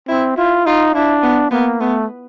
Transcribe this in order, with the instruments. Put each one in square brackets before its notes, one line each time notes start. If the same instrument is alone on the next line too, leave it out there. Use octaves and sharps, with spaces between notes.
[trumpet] C4 [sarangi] E4
[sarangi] E4 [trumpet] F4
[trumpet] D#4 [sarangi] F4
[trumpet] D4 [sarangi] E4
[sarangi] B3
[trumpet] A#3 [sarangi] B3
[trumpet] A3 [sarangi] B3